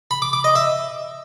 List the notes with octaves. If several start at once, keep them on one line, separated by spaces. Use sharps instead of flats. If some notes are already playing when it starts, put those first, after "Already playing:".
B5
D6
D6
D#5
E5